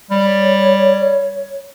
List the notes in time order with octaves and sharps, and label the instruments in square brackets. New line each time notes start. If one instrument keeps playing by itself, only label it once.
[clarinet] G3 [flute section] C#5